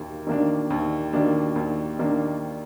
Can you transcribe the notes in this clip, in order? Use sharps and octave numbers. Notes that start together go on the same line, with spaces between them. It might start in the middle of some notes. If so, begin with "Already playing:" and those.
Already playing: D#2 A#3
D#3 A#3 D4
D#2
D#3 A#3 D4
D#2
D#3 A#3 D4